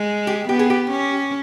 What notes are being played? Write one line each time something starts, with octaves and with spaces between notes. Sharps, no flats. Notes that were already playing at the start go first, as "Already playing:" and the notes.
Already playing: G#3
G4
B3 G4
G#4
G4
C#4